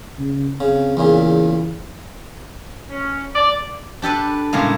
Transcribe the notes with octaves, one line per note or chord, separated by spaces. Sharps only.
C#3
C#3 C4
E2 A#2 C#3 E3
C#4
D5
D4 G4 A4 B4
A2 C#3 G3 G#3 A#3